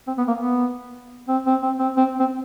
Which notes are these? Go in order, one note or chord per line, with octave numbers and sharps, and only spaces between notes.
C4
B3
A#3
B3
C4
C4
C4
C4
C4
C4